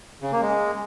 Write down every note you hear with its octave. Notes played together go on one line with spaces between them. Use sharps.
C#3
A#3
G#3